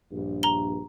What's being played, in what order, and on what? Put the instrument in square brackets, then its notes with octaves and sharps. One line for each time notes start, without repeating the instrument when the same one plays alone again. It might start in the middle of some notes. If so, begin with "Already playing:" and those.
[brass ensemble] A#1 G2
[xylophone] A#5 G7